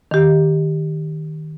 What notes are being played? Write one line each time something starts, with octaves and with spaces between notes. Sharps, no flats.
D#3 G4